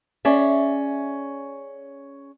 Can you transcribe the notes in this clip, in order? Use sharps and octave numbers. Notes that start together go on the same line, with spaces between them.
C#4 G#4 D5 E5